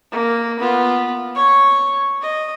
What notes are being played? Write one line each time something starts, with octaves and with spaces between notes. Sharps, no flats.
A#3
B3 F4
C#5 C#6
D#5